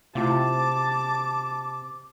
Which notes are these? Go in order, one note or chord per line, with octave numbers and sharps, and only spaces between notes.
C3 A3 E4 F4 A5 D6